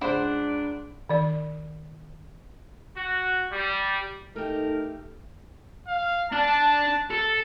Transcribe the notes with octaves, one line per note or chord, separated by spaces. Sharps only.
C#2 D4 C5 F#5 B5
D#3 D5
F#4
G3
A3 D#4 G4 A4 A#4
F5
D4 A5
A4